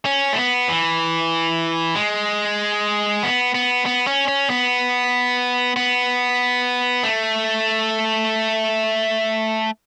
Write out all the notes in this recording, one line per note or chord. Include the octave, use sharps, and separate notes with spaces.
C#4
A3
B3
E3
G#3
B3
B3
B3
C#4
C#4
B3
B3
A3